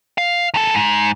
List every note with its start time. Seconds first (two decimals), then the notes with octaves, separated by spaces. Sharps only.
0.18 F5
0.54 E2 A4
0.74 G#2